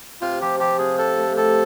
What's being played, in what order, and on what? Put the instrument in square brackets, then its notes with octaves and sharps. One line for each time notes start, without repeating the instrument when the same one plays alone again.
[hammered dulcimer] C3 [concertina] F4
[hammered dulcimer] F3 [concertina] G4
[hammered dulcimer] F3 [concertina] G4
[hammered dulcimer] C3 [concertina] G#4
[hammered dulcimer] C3 [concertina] A4
[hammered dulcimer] A3
[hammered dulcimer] C3 [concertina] A4